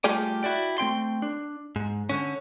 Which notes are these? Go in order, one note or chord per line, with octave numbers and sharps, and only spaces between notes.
G3 A3 F4 G4 G#4 D5
E4 F#4 D5 G5
A3 C4 G5 C6
D4
G#2
D3 C#4